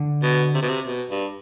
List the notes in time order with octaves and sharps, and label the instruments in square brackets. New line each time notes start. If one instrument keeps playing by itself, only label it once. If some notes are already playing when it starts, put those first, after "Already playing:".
Already playing: [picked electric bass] D3
[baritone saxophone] B2
C3
B2
C3
B2
G2